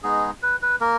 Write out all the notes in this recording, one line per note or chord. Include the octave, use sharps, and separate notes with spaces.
G#3 B3 D#4 G#4
B4
B4
A#3 A#4